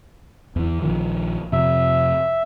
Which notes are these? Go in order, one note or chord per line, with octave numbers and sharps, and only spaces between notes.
E2 E3
A#1 D#3 F3
F2 C3 E5